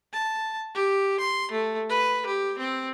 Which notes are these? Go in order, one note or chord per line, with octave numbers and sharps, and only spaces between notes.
A5
G4
C6
A3
B4
G4
C4